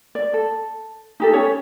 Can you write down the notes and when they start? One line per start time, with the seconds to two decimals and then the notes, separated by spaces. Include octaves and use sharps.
0.15 D5
0.34 A4
1.20 D#4 G4 A4
1.33 C#4 C#5